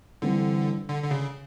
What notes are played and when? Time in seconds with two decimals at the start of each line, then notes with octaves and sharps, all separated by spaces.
0.22 G2 D3 E3 G3 C4
0.89 D3
1.03 D3
1.11 C#3